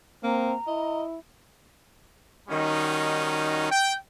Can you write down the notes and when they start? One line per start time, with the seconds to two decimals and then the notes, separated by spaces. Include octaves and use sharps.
0.24 A#3 C4 A#5
0.68 E4 D#5
2.49 D#3 G3 C#4 D#4 F#4
3.71 G5